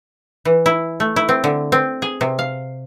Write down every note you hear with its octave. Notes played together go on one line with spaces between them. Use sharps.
E3
E4
A3
E4
C4
D3
C4
G#4
C3
F5